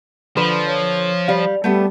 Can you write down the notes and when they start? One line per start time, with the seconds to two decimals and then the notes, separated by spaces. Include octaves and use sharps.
0.37 D3 F3 B4 C5
0.67 C#5
1.28 G3 F5
1.64 G3 A3 B3 A4